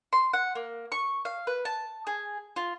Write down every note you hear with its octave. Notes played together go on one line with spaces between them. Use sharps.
C6
F#5
A#3
C#6
F5
B4
A5
G#4
F4